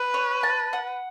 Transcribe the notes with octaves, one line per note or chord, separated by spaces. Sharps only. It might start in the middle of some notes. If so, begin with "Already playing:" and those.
Already playing: B4
C#5
A5
F#5